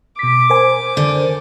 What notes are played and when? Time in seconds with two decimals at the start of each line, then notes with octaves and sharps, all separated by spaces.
0.19 B2 D6 B6
0.50 A#4 C5 G#5
0.97 D3